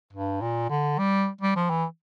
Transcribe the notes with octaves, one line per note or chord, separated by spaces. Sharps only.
G2
A#2
D3
G3
G3
F3
E3